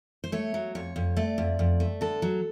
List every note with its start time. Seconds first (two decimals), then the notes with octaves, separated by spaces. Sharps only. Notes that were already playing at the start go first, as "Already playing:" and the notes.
0.24 C5
0.32 A3 C#5
0.54 F#3
0.75 F2 C#5
0.96 F2
1.17 A3 D5
1.38 F2
1.59 F2
1.80 A3
2.01 D3 A4
2.22 F#3